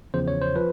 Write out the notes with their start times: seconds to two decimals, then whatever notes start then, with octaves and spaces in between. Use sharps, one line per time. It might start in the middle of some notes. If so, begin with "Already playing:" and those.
0.14 E2 C#3 F3 C5
0.28 C#5
0.42 C5
0.55 F3 B4